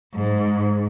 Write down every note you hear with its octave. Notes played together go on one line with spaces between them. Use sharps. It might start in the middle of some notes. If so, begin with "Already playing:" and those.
G#2